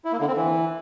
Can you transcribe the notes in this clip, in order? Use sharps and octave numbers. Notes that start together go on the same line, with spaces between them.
E4
A#3
D3
C4
E3